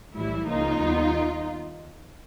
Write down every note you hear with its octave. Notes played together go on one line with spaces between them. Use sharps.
B1 A2 E3 G3 E4
C#2 C#3 F3 A#3 D#4 F4
D#2 D#3 G3 B3